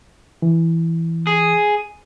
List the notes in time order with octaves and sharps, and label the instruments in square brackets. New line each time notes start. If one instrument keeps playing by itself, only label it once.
[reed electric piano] E3
[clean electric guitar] G#4